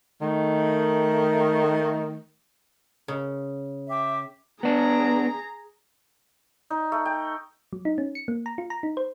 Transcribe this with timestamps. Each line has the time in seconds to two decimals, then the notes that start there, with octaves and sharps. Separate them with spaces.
0.20 D#3 A3
3.08 C#3
3.89 E5 G5 D6
4.63 B3 D4 G#4 A#5
6.70 D#4
6.92 A3
7.05 G5
7.73 F#3
7.85 D#4
7.98 C#4
8.15 C#7
8.28 A#3
8.46 A#5
8.58 F4
8.70 A#5
8.83 D#4
8.97 C5